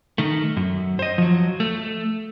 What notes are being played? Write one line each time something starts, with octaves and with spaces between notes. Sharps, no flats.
D#3 A3
F#2
C5 D#5
F3 F#3
A3